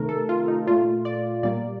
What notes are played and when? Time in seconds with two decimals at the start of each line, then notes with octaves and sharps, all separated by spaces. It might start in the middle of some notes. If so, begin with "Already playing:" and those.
Already playing: C3 D#3 A3 A#4
0.09 A4
0.29 F4
0.48 D#4
0.67 A#2 A3 F4
1.05 D5
1.43 A#2 G3 A#3 D5